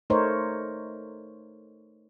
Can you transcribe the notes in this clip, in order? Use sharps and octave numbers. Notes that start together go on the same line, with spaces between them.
A3 D#4 A#4 C5 C#5